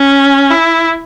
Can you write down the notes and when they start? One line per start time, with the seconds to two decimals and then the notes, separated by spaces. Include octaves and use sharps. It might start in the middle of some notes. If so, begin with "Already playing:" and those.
Already playing: C#4
0.51 E4